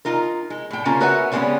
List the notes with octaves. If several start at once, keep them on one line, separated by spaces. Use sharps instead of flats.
D#4 F4 A#4
G#3
A2 G5
C#3 A#3 C#4 F4 A#5
F#4 A#4 B4 C#5 E5 F#5
C#3 G3 G#3 A#3 B3 C#4